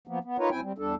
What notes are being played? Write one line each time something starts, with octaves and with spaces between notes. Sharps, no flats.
F3 A#3 B3
B3
D#4 F4 A#4 B4 C#5
F#2 C4 E4 G5 G#5
G3 C4
E2 G3 D4 A4